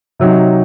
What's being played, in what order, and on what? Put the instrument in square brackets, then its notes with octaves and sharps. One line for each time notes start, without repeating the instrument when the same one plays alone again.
[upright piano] C3 F#3 C4 D#4